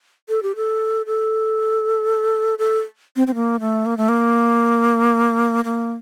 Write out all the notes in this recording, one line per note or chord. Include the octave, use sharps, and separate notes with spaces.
A4
G4
A4
A4
A4
C4
C4
A#3
A3
A#3
A3
A#3
A#3